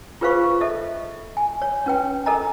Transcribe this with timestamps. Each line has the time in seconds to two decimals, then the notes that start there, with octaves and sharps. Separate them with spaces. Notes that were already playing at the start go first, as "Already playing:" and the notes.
0.21 F4 G#4 B4 C5 F5 C#6
0.61 A4 D#5 E5
1.37 G#5
1.62 C#5
1.86 C#4 B4 G5
2.26 A4 A#4 D#5 G#5 A#5